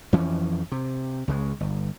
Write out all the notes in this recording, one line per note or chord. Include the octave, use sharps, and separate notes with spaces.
F2 E3 F3 C#4
C3
C#2 C#3 G#3
G1